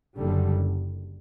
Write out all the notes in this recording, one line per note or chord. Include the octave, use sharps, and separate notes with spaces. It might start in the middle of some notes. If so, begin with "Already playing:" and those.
F#1 F#2 D3 G3